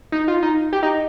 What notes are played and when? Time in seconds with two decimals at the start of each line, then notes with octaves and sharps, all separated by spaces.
0.12 D#4
0.28 F4
0.43 D#4
0.73 G4
0.83 D#4